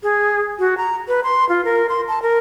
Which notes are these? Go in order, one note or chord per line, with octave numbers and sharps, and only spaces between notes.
G#4
F#4
A#5
B4
C6
F4
A#4
C6
A5
A#4